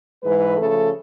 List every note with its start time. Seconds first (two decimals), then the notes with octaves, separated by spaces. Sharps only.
0.23 G#2 E3 G#3 B4
0.57 C#3 F3 A3 A4